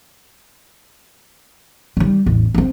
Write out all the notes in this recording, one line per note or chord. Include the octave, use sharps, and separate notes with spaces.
D#3 G3
A1 E2
A#3 C4